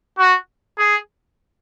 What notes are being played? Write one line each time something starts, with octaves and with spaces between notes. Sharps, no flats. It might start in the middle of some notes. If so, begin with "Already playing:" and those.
F#4
G#4